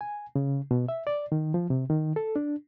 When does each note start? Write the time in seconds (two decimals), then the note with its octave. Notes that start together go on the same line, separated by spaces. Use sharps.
0.01 G#5
0.36 C#3
0.71 B2
0.89 E5
1.07 D5
1.32 D#3
1.54 F3
1.70 C3
1.90 D#3
2.16 A4
2.36 D4